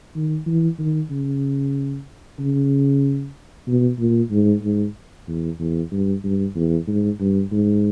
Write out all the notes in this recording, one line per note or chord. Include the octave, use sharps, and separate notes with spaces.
D#3
E3
D#3
C#3
C#3
B2
A#2
G#2
G#2
E2
E2
G2
G2
E2
G#2
G2
G#2